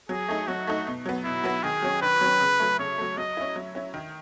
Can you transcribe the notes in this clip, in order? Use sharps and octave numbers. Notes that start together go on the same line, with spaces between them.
F#3 G#4
A3 D#4
F#3 F#4
A3 D#4
B2
F#3 B3
B2 E4
F#3 B3
D#3 G#4
F#3 C#4
D#3 B4
F#3 C#4
C#3
F#3 A3
C#3 C#5
F#3 A3
F#3 D#5
C#4 E4
F#3
C#4 E4
D#3